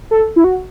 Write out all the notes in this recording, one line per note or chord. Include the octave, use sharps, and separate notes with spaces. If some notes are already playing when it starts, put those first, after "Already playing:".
A4
E4
F#4